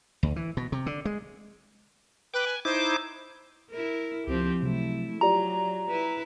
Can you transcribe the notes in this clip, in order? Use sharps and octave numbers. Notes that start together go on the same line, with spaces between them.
D2
E3
B2
C3
D3
G#3
B4 G5 D6
G#5
D#4 E4 C5 D6
E4 A#4
C#2 F3 C4 G4
C3 F#3 A3 E4
F#3 F4 G4 D5 A#5
E4 B4